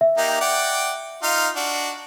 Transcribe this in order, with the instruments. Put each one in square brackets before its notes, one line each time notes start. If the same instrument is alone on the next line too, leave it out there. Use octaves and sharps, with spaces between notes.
[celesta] E5
[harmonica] A#3 D#4 G4
D5 F#5 G5
D#4 F4 F5
D4 F#4